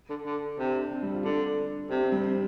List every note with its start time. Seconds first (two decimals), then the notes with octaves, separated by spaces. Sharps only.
0.09 D3
0.26 D3
0.59 C3 D4
0.75 D4
0.92 C4
1.03 G3
1.14 F4
1.24 D3 D4
1.90 C3 D4
2.01 C4
2.12 G3
2.24 C4